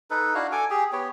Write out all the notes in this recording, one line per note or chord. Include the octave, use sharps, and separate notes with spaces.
D#4 A4 B4
D4 E4 F#4 F5
A4 G#5 D6
G4 G#4
B3 G4 C#5